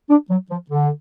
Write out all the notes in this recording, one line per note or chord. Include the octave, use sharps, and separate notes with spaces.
D4
F#3
F3
D3